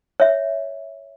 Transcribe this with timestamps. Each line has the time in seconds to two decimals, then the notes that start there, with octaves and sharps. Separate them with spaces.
0.20 C#5 E5